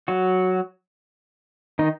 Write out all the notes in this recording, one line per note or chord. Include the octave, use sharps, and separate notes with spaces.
F#3 F#4
D#3 D#4